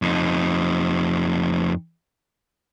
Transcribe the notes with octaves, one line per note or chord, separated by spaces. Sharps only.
F2 D#4